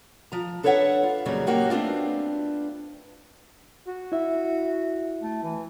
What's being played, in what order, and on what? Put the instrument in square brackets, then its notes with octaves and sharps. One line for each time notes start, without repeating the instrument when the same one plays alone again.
[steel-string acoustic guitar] F3 A#5
D4 A4 B4 C#5 E5 F#5
F4
F2 A#2 C#3 F#3 G3
F#3 A#3 D#4 F#4 G4
A3 B3 C4 D4 F4
[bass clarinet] F#4
[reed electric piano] E4 E5
[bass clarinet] A3
E3